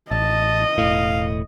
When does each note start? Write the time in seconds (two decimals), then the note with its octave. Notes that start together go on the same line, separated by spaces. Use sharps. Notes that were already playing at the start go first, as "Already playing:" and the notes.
0.11 A1 D#5 A5
0.78 E1 A2 F5